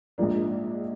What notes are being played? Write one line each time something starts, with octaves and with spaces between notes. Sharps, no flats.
A#1 G#2 F3 A#3 D4